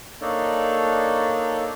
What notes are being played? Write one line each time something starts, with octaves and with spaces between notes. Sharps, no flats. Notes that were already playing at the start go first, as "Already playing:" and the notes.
A#3 D4 D#4 A4 C#5 D5